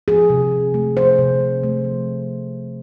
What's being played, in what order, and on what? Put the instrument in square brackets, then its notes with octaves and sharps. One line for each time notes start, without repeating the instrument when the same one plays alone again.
[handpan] F3 G#4
C3
C3
A3
F3 C5
C3
C3
A3
F3